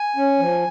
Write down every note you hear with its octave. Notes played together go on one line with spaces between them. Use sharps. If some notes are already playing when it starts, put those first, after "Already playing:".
Already playing: G#5
C#4
F3